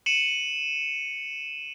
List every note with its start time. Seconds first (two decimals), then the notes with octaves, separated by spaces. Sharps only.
0.06 C#7 D#7 E7 F#7